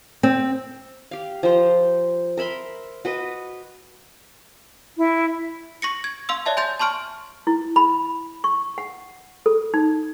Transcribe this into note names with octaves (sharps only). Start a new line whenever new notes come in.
C4
G4 F5
F3 C5 A#5
A#4 E5 B5 C6
F#4 B4 D#5
E4
C#6 A#6 C#7
G#6
F5 C6 E6
C#5 D5 E5 A5
G#5 C6 G6 A6
A5 C6 C#6 F6 D7
E4
B5
C#6
F#5
A4
D#4